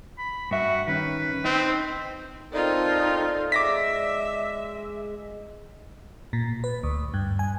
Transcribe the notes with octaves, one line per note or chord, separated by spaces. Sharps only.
B5
G2 F#4 E5
D#3 C#4 B4
C4 D#4
C4 D#4 F4 A4 A#4 D5
G#3 E5 D6 A#6 B6
A#2
B4
D2
G2
G#5